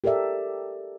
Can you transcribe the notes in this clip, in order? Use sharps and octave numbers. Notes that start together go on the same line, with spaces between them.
G4 A4 A#4 D5 E5